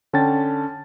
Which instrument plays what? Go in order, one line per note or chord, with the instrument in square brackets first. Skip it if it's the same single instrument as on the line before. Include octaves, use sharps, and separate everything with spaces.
[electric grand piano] D3 C#4 G5 A5 A6